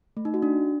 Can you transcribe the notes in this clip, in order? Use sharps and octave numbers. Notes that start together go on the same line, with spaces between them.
A3
D#4
F#4
D4